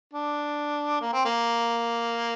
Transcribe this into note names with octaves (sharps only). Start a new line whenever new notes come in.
D4
A#3
C4
A#3